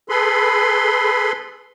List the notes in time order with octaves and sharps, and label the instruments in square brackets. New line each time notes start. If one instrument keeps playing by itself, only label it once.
[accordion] G#4 A4 B4 B5 C6